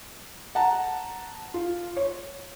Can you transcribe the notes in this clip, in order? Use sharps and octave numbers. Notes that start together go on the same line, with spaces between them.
F#5 A5 A#5
F4
C#5